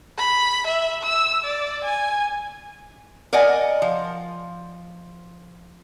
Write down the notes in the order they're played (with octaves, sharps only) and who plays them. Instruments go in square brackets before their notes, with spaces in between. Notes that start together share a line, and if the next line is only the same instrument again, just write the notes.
[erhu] B5
E5
E6
D5
G#5
[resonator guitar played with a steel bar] A#4 D5 D#5 F#5 G#5
F3